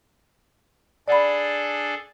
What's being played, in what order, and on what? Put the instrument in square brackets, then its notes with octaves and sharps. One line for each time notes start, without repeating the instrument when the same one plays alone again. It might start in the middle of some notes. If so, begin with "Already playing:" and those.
[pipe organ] D4 G#4 A4 [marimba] D5 F#5 B5